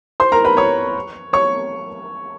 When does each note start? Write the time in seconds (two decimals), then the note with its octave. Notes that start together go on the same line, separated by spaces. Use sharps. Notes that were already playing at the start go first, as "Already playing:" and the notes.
0.20 C5 C6
0.32 A#4 A#5
0.45 B4 B5
0.57 C#5 C#6
1.33 C#5 C#6